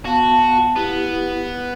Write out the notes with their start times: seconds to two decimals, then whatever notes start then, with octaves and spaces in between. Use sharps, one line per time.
0.05 B3 F#4 F5 A5
0.76 B3 E4 G4